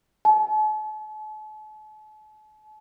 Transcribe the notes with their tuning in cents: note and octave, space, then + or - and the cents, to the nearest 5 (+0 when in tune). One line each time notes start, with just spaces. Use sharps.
A5 -45